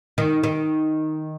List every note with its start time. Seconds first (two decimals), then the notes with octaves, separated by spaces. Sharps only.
0.18 D#3
0.44 D#3